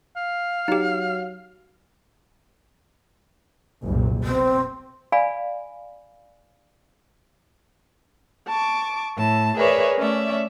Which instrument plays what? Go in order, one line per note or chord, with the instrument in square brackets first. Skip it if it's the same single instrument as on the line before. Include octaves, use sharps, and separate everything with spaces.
[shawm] F5
[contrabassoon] F#3 [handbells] D#4 G4
[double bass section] F#1 C2 A#2
[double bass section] B2 [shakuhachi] C4
[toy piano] D5 F5 G#5 B5
[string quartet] A5 C#6 D6
A2 A5
G#4 A#4 B4 C#5 D5 E5
A3 C#4 D5 E5